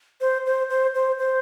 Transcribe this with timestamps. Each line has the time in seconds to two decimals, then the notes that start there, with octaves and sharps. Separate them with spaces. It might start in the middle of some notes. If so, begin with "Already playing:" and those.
0.21 C5
0.46 C5
0.70 C5
0.95 C5
1.19 C5